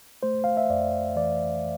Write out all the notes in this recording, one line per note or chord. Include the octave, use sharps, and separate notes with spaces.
A3 C5
F5
E5
F2 D5
E3 D5